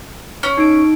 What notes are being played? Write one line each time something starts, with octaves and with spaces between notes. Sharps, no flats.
C#4
D#4 D7